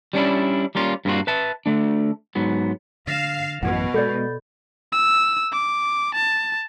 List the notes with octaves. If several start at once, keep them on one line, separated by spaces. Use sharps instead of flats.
G3 C#4 D4 E4
G3 A#3 C#4 F4
G2 A#3 C4 C#4 F4 F#4
B4 E5 A5
D3 A3 D4
G#2 F#3 B3
D3 F5 A6 A#6 E7
A1 F#2 B2 E3 F#5 G#6
G#3 B3 A4 D5 B5 G6 A6
E6
D6
A5